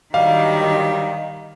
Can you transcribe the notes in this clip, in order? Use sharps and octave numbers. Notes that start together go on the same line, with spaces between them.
G2 D#3 F#3 G3 D#5 F5